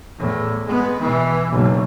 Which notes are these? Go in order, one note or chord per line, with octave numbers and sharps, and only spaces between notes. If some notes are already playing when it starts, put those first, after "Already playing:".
E2 A2
G#3 B3
B2 E3
F#1 B1